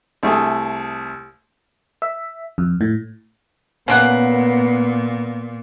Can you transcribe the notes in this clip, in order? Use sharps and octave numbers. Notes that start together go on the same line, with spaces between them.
C2 A3 G#4
E5
F2
A2
A#2 C#3 A#3 B3 F#5